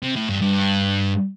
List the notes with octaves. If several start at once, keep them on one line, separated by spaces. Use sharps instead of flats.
C3
A2
G2
G2